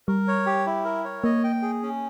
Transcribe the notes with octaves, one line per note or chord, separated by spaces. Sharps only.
G3 A#4
C#5
G4
E4
A#4
C#5
A#3 D#5
G5
G#4
C#4